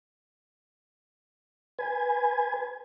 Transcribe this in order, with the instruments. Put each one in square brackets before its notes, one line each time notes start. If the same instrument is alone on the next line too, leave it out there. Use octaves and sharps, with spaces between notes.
[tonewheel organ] B4 G#5